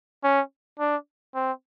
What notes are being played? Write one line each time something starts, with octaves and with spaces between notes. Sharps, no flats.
C#4
D4
C4